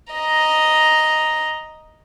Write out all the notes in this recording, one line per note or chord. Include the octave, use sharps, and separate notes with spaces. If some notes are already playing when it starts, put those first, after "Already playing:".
D#5 A#5